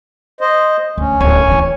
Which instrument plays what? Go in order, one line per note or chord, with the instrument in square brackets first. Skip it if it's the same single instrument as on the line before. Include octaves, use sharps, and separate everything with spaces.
[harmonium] C5 D#5
[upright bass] D2 [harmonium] C#4
[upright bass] D1 [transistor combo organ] C#5 G#5
[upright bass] E3 E4